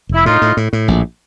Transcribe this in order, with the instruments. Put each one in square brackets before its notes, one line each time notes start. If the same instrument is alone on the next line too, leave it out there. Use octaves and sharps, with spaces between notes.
[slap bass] F1 [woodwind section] E4
[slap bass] A2 [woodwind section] D#4 F4
[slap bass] A2
A2
A2
A#1